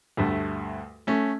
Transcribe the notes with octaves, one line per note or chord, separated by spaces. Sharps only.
D2 G2 A3
A3 C#4